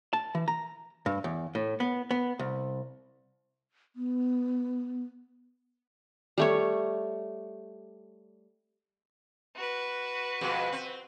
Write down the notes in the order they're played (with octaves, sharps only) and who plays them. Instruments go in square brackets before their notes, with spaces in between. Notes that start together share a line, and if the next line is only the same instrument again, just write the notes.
[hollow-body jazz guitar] A5
E3
A#5
G2
E2
A2
B3
B3
C2
[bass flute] B3
[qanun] G3 A3 C#5
[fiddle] F#4 B4
[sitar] F2 B2 G#3
C4